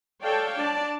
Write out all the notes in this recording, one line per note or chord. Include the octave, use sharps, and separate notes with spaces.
A4 C#5 D5 F5 G5 A5
D4 D5 A5